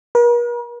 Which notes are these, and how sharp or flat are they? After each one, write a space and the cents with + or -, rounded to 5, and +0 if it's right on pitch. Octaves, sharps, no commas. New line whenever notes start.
A#4 +45